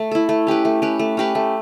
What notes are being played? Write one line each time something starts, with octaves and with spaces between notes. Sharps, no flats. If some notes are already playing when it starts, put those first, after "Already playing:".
Already playing: A3
E4 A4
A3
C#4 G4 B4
A3
C#4 G4 B4
A3
C#4 G4 B4
A3